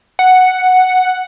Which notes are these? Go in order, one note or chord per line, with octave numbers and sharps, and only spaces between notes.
F#5